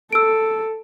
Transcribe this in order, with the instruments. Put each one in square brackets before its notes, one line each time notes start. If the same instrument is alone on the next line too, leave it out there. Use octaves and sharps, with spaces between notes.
[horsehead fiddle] A4 [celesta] E6 D7